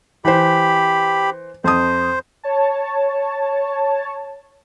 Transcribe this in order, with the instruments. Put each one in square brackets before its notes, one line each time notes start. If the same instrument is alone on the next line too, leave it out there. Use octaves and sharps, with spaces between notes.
[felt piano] E3 C5 [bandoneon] G4 B5
[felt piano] F2 D#6 [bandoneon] C5
[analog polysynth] C#5 A5